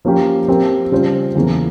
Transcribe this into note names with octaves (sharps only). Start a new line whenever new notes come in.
F3 A#3 C#4 G4
F3 C4 G4 A#4
C#3 G3 C#4 F4 C5
E2 C#3 E3 A#3